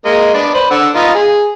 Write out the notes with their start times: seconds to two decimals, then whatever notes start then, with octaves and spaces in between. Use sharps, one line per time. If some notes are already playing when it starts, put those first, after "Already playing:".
0.05 G#3 A#3 D#5
0.34 B3 D4 D5
0.54 B4 C5
0.71 D3 F#5 E6
0.95 B3 D#4 F4
1.15 G#4